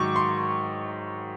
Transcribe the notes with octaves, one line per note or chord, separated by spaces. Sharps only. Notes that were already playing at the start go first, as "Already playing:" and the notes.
Already playing: G#2 D#3 F#3 C#6 D6
C6